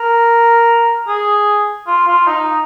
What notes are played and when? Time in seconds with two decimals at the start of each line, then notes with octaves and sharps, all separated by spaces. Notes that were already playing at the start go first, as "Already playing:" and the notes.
Already playing: A#4
1.08 G#4
1.87 F4
2.08 F4
2.27 D#4